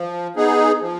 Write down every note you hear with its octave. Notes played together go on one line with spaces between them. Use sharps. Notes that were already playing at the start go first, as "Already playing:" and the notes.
Already playing: F3
B3 D#4 G#4
F3